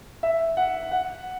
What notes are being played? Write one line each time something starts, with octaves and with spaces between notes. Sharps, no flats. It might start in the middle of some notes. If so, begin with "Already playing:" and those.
E5
F#5
F#5